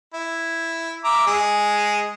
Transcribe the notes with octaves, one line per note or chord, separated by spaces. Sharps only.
E4
E5 A#5 D6
G#3 G#4